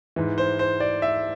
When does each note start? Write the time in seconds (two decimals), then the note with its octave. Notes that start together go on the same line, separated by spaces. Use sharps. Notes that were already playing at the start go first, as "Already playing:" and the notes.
0.16 G#2 E3
0.38 C5
0.59 C5
0.80 D5
1.02 E5